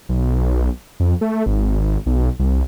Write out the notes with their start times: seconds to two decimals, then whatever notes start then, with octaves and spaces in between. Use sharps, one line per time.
0.09 B1
1.00 F2
1.21 A3
1.46 G#1
2.06 B1
2.39 C2